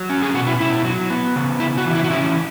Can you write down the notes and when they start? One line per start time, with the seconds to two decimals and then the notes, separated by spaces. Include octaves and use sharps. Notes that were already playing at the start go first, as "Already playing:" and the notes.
Already playing: F#3
0.10 C#4
0.22 G#4
0.34 B2 F#4
0.47 E4
0.60 B2 E4
0.85 F#3
1.10 B3
1.36 C#3
1.60 C#3 E4
1.78 F#4
1.85 E3
1.95 E4
2.04 F#4
2.10 C#4 E4